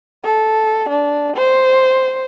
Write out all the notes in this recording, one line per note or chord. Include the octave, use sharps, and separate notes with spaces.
A4
D4
C5